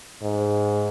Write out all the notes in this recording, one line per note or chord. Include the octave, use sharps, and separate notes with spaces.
G#2